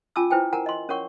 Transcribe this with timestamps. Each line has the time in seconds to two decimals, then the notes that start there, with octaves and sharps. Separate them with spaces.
0.16 C#4 F4 G#5 A5 D6 E6
0.30 E4 B4 C5 G5 G#5
0.53 A#4 F#5 G#5 A#5
0.66 D#5 C6
0.89 C#4 A#4 C#5 F#5 C#6